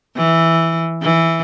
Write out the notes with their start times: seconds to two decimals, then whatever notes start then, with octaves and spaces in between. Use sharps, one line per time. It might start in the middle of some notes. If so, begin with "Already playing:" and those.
0.17 E3
1.03 E3